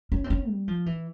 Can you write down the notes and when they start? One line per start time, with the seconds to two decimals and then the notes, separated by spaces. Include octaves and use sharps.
0.12 C#4
0.24 C4
0.30 C#4
0.49 G3
0.68 F3
0.86 E3